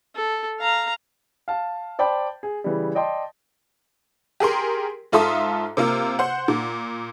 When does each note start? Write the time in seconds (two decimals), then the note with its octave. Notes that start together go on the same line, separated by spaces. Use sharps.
0.16 A4
0.60 F5 A#5
1.48 F5 A5
1.99 C5 D5 G5 A5 B5
2.43 G#4
2.64 C#3 E3 G3
2.95 D5 D#5 G5 A5 C6
4.40 G4 G#4 A#4 C6
5.12 G#2 F4 A4 E5 C6 D#6
5.77 C3 A#3 F4
6.19 C5 F#5
6.48 A#2